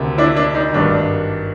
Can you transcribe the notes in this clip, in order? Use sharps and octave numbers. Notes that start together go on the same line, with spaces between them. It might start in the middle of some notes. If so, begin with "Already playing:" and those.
Already playing: D2 C3 D#3
D4 E4
D4
D#4
G#1 G2 D#3 D4